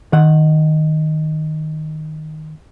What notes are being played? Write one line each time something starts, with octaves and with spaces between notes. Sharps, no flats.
D#3 F#5